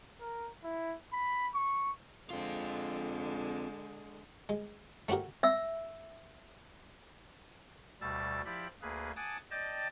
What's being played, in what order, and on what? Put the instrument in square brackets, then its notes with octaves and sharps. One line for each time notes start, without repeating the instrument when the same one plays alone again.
[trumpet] A#4
E4
B5
C#6
[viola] D3 G#3 [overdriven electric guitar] C4 F4
[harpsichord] G#3
A3 C4 F#4 G4 A#4
[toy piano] E5 E6
[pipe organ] D2 B2 G3 E6 A6
F3 E4 G4 D5 B5
D2 A#3 G#4 B4
F#5 G#5 A5 D6 D#6
D5 D#5 G5 A5 G6 A6